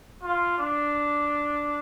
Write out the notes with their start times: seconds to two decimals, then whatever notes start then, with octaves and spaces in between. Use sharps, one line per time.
0.23 F4
0.58 D4